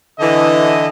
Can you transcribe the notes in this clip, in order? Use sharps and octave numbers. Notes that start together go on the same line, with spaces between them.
D3 E3 D#5